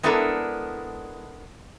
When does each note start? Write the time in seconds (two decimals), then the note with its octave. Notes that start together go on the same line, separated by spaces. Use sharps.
0.03 G#3 B3 D4 E4 A4 A#4